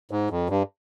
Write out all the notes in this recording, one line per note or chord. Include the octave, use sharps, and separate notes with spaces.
G#2
F2
G2